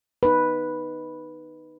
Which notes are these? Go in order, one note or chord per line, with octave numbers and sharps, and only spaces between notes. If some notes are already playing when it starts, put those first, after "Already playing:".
D#4 B4